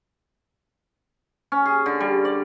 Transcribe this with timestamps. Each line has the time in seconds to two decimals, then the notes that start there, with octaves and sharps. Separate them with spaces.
1.52 C#4
1.66 G#4
1.86 D3
2.00 G3
2.25 D5